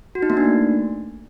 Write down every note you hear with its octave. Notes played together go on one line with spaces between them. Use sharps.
F#4
D#4
A#3
D4
A3